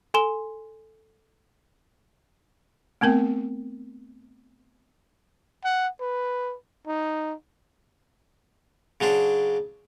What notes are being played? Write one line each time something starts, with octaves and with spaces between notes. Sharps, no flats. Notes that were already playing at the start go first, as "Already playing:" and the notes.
A4 G#5 C6 E7 G7
A3 B3 C4 A#4 G5
F#5
B4
D#4
C#3 F#3 D4 C5